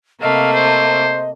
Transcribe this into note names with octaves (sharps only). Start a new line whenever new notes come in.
C3 A3 A#3 D#5 F5
C5